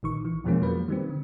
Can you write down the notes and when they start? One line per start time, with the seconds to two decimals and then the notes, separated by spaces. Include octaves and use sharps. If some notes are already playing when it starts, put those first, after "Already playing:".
0.03 A#1 D#3 C#6
0.25 E3
0.44 F2 B2 F3 G#3 A#3 C#4
0.62 F#3 A#3 B4
0.88 D#3 G3 C4
1.09 D3